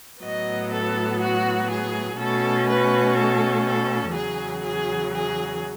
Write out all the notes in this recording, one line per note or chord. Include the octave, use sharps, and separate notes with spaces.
A2 F#3 B3 D#5
A4
F#4
G#4
B2 A3 C#4 A4
B4
A4
A4
E2 C#3 F#3 G#4
G#4
G#4